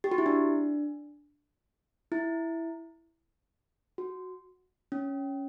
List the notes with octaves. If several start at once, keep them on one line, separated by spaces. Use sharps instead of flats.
G4
F#4
E4
D4
E4
F#4
C#4